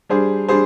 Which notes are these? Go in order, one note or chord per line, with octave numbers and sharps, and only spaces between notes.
G3 D4 G#4 C5
G3 D4 G#4 C5